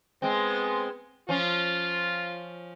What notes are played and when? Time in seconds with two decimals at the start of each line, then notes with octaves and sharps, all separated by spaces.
0.22 G#3 B3 C4
1.29 F3 C#4 F4